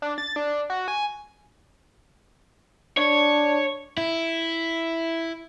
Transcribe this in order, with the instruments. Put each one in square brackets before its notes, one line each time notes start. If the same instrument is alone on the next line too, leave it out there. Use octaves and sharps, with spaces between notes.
[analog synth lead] D4
A6
D4
F#4
G#5
[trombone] D4 [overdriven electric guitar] C#5
[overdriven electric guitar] E4